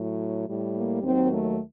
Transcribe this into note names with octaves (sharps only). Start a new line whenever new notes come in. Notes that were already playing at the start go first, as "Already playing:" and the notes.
Already playing: A2 F#3
A2 G3
A#3
D#2 D#3 F#3 C4
A3